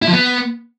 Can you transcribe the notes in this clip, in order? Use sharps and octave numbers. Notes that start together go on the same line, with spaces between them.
E4
F3
B3